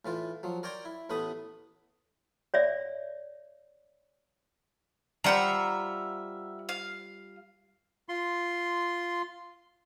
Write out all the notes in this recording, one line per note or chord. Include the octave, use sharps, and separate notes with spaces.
A2 E3 F4
F3 F#3
A#4 C#5 D5 G5 A#5 C6
E4
A1 A2 A3 B3 B5 D#6
C#5 D5 E5
G3 F4 C5 E5 F#5 A#5
F5
F4 C6